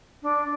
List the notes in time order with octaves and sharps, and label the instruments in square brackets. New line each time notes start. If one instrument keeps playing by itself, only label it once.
[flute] D4